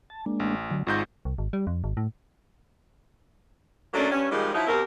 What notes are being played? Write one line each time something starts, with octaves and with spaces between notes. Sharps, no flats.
A5
G#3 A#3 D4
A1
D3 F#3
G#1 G#2 F4 C#6 G6 A#6
C2
G#1
G3
F2
G#1
A2
F#3 A3 A#3 C#4 D4
G2 C#4
D#3 F3 G3 G#3
F3 F#3 D#4 E4
B2 A#3 C4 G4 A#4